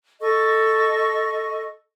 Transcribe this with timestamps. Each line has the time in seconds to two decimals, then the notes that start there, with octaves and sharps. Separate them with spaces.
0.20 A4 D#5 C#6